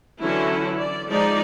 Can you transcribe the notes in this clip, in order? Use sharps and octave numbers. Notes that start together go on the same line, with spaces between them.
D3 E3 F#3 C#4 E4 F#4
D5
F3 G#3 D#4 D5